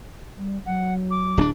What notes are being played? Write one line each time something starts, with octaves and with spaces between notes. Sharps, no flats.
G3
F#3 F#5
D6
D1 C#4 D4